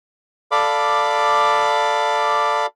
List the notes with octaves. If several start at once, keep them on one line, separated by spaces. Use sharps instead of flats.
A4 D5 F5 B5 D6